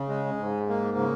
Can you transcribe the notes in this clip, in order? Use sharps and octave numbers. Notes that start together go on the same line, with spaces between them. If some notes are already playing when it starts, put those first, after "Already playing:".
Already playing: C#3
G#3
G#2
A#3
C#3